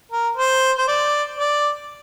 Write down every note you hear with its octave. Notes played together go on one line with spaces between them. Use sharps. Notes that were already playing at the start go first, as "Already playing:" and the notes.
A#4
C5
C5
D5
D5